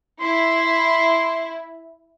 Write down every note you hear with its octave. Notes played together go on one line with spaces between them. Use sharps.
E4 C6